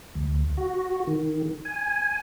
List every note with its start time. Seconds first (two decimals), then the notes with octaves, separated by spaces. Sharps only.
0.15 D2
0.57 F#4
1.07 D#3
1.65 G#5